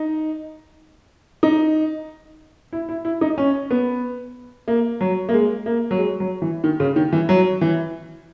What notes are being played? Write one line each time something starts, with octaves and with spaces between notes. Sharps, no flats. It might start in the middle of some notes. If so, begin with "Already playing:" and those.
Already playing: D#4
D#4
E4
E4
E4
D#4
C#4
B3
A#3
F#3
A#3
G#3
A#3
F#3
G#3
F#3
E3
D#3
C#3
D#3
E3
F#3
E3